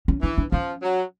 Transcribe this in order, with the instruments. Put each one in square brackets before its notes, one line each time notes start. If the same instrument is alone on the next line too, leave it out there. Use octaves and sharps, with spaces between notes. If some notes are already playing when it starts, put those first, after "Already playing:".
[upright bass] C#4
[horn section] E3 [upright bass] D4
[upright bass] D4
[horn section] F3 [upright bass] C#4
[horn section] F#3